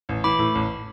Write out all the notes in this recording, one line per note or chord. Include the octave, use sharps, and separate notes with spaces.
A1
E3 B5 D6
A2
A1